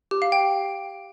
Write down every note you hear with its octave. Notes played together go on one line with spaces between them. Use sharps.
G4
F5
G5